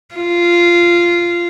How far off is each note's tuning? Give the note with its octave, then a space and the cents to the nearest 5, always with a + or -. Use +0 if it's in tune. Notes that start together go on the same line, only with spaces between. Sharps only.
F4 -10